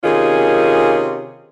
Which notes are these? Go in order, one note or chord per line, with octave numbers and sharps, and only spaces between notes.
C3 D#3 C#4 F4 G#4